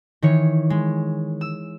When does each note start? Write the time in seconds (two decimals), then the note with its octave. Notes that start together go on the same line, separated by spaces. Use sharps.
0.22 D#3 E3 C#5
0.70 G#3
1.41 E6